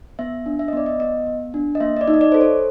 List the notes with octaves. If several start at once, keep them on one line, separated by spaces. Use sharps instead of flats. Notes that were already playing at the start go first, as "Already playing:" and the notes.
B3 E5
D4
E5
D#5
B3 D5
D#5
B3 D#5
B3
D4
D#5
A#3 E5
D#5
D5
D#4
D#5
D5
A4 C5
C#5